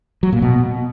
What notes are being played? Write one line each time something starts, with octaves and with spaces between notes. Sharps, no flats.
F#3
A#2
B2